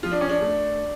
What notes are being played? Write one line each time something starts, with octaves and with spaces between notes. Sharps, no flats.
F3 F4
D4
C#4
D4
A3